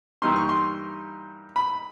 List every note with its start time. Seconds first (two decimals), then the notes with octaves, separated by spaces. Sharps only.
0.22 G2 E3 G3 A#3 D#4 C6
0.36 C#6
0.49 C6
1.56 B5